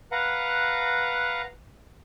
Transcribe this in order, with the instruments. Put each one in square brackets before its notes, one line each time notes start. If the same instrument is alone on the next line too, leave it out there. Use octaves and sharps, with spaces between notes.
[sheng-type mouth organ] B4 F5 F#5 A#5